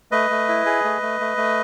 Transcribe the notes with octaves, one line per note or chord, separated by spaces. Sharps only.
A3 B4 D#5
A3
E4
G#4
A3
A3
A3
A3